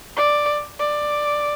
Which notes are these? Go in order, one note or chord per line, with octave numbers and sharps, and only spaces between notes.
D5
D5